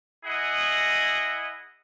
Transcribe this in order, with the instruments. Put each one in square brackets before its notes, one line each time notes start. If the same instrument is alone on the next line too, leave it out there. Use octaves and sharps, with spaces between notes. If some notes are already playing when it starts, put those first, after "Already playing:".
[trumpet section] E4 G#4 D#5 F#5